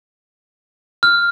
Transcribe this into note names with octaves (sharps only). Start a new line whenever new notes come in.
F6